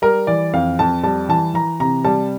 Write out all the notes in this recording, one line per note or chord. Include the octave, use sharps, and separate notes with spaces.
G3 A#4
E3 D5
F2 F5
F2 A5
G3 A5
E3 A5
E3 A#5
C3 A#5
G3 A5